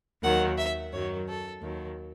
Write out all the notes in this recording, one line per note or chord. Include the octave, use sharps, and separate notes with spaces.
D#2 D#3 F#3 F#5
E5
F#2 D#3 F#3 C#5
A4
D#2 D#3 F#3